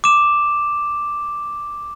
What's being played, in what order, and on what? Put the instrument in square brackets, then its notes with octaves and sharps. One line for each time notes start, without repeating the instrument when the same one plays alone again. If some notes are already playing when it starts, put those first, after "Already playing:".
[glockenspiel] D6 E7